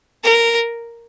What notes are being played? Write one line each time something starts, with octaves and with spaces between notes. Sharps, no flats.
A#4